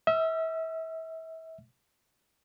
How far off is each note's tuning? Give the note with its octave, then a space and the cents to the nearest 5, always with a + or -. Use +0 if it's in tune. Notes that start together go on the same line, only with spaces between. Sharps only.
E5 -30 E6 +45